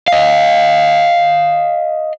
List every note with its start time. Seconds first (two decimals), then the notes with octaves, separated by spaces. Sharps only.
0.08 D#5 F5